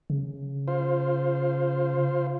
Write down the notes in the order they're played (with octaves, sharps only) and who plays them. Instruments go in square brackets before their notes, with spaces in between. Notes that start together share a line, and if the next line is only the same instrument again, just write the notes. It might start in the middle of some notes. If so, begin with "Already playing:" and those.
[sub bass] C#3
[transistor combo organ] F4 C5